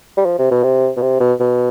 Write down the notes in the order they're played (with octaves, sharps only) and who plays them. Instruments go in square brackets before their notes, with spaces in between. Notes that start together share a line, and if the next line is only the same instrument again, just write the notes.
[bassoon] G3
F3
C3
B2
C3
B2
C3
B2
B2